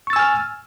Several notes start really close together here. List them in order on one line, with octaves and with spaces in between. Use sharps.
C#6 A6 E6 G#5 F6